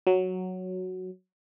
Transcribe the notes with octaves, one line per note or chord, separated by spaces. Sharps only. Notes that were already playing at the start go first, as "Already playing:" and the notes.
F#3